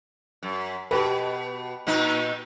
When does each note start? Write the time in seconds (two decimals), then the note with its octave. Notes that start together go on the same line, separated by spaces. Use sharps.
0.43 F#2
0.91 B2 G4 B4
1.87 A#2 B3 D#4